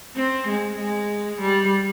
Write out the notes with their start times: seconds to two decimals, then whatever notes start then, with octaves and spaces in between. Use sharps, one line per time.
0.16 C4
0.47 G#3
0.78 G#3
1.41 G3